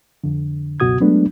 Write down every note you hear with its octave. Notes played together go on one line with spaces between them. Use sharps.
F2 D3
C#2 F#2 B2 F#4 D#6 G#6
F#3 G#3 A3 B3 D4